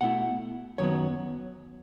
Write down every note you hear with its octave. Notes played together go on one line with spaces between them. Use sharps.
B2 A3 E4 F#5
F#2 D#3 F#3 B3 C#5